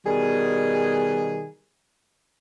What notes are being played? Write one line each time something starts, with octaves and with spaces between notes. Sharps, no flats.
B2 D#3 G3 G#4